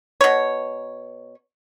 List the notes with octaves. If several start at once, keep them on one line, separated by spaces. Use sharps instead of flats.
B2 C#5